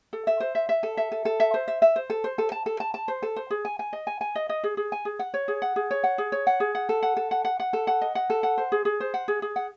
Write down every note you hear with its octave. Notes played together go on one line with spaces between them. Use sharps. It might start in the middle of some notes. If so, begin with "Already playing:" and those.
A4
E5
C5
E5
E5
A4
E5
A4
A4
E5
C5
E5
E5
C5
A4
C5
A4
A5
A4
A5
A5
C5
A4
C5
G#4
G#5
G#5
D#5
G#5
G#5
D#5
D#5
G#4
G#4
G#5
G#4
F#5
C#5
G#4
F#5
G#4
C#5
F#5
G#4
C#5
F#5
G#4
F#5
A4
F#5
A4
F#5
F#5
F#5
A4
F#5
D#5
F#5
A4
F#5
C5
G#4
G#4
C5
F#5
G#4
G#4
F#5